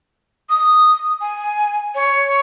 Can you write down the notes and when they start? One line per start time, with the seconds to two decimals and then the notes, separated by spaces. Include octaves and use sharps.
0.50 D#6
1.21 G#5
1.95 C#5